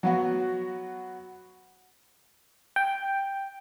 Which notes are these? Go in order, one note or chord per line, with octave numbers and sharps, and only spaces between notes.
F#3 B3 F#4
G5